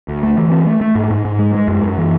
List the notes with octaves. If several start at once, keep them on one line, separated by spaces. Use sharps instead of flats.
D2
A3
E3
C4
A3
A3
G#2
G#2
G#2
G#3
G#3
F#2
F#2
E3